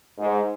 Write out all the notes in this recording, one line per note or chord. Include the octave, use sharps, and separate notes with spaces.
G#2